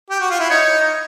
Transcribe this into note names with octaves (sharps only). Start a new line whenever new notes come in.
G4
F#4
F4
E4
D#4 C#5